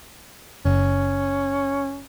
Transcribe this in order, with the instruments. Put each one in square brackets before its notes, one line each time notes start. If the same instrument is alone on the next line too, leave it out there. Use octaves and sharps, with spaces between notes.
[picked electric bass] F#1 [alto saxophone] C#4